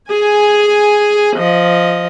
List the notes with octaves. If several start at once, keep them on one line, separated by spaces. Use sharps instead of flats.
G#4 G#5
F3 D#5